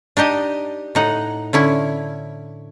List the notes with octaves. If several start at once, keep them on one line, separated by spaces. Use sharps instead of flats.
D4 D#4 G4 D#5
A2 D#4 F#5
D3 C#4 E4